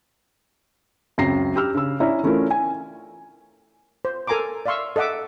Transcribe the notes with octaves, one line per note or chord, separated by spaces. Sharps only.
C#2 F#2 C4 A#6 C7
G4 E6 F6
C#3 E6
C#4 E4 D5 E5 A#5
E3 A3 C#4 E4 F4 A#4
G#5
C5
A4 A#4 G#5 A#5 C6 D6
D5 E5 F5 C6 C#6 E6
A4 D#5 E5 F#5 D6